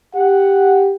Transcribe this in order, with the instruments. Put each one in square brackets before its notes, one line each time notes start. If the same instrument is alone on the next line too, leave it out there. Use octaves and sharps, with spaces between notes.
[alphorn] G4 [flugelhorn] F#5